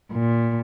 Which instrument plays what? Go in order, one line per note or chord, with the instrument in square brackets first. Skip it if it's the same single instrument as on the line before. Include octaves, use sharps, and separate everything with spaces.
[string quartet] A#2